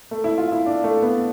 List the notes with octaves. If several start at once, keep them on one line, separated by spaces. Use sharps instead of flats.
A3
E4
F4
E4
D4
A3
B3